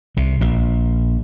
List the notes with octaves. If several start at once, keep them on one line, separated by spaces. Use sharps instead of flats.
C2 C3
A#1 A#2